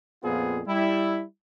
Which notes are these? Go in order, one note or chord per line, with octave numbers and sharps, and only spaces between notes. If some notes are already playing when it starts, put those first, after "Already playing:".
F2 A#2 B3 C4 F4 G#4
G3 E4